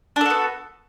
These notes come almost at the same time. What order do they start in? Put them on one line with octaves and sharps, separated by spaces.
D4 A4 F#4 B3